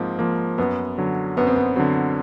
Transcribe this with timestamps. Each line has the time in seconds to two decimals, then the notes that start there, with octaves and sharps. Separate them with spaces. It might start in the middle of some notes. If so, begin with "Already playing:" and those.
Already playing: G#2 F3 A#3 C4
0.19 F3 A#3
0.58 F#2 B3
0.98 D3 F#3
1.37 F#2 B3
1.47 C4
1.56 B3
1.76 D3 F#3 C4